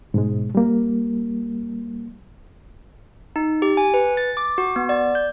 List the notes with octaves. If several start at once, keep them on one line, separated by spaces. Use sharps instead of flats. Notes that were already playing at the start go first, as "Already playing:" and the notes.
G#2 B2 G#3
G3 A#3
D#4
G4
G#5
B4
A6
D6
F#4
B3
D5
G6